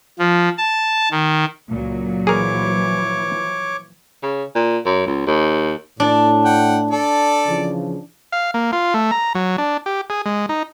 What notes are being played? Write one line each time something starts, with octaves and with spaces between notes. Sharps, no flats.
F3
A5
D#3
C#2 A#2 F#3
E3 F3 G#4 A#4 C#5 D6
C#3
A#2
F#2
C#2
D#2
A2 D4 D5
F#5 G5
A4 D5
C#3 E3 F3
F5
A#3
F4
A3
A#5
F#3
D4
G4
G#4
G#3
D#4